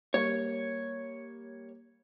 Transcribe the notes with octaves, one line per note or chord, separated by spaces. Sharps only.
G3 A#3 C#5